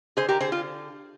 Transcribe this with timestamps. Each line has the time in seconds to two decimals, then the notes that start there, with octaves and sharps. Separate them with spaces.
0.17 D3 G#4 C5
0.29 G4 A#4
0.40 D3 G#4 C5
0.52 F4